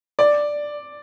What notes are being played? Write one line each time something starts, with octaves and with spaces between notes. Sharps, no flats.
D5